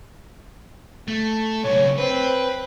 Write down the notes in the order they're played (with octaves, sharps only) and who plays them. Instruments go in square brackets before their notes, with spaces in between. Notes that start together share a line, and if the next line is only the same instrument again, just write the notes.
[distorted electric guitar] A3
[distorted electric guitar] B1 C#3 [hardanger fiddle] C#5
[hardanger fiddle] C4 [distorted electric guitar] B4